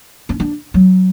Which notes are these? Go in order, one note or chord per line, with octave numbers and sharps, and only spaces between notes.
C#4
D4
F#3